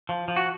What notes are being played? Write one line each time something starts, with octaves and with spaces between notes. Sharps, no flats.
F3
F3
F#4